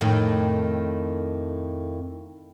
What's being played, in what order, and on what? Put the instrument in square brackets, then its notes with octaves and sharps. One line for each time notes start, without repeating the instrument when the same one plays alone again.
[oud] F2 A2 D#3